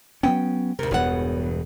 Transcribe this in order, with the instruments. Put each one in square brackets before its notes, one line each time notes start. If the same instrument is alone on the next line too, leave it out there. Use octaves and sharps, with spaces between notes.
[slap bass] F#3 B3 C#4 [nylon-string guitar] G5
[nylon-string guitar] D2 A#4 [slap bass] C3
[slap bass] E1 E2 G2 [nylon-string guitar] B3 C#5 F#5